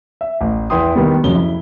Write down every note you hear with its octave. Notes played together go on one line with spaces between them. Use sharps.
E5
A1
E2 E4 B4 G5 C6 D#6
D#3 G3 B3
F2 C#3 F#3 G7
E4